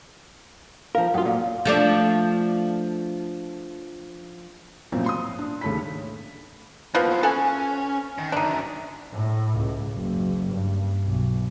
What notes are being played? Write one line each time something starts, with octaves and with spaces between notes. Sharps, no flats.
F3 A#4 F5
F#2 F4 F#5 G5 D#6
A#2 A4 F5
F3 A3 D4
F#2 A#2 E3 F3 C4
C6 D#6
D4
D#2 C#3 A3 C#4 B5 B6
F3 F#3 A#3 B3
A4 C6
C#4 A4 F#5 G#5
D#3
F#2 D3 D4 D#4
A2
C#2
F#1
G2
B1